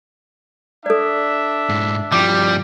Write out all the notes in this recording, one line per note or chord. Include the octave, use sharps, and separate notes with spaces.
D4 A4 D5 E5
G#2 E4
G2 F3 G3 D6